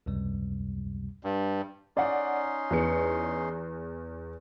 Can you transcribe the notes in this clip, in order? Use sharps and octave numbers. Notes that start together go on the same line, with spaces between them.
C#2 F#2 C3 G3
G2
C#4 D#4 D5 F#5 C6
E2 B3 C#7